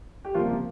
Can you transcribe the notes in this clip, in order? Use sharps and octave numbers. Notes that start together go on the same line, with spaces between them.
G4
C#2 C3 F3 G3 A#3 F4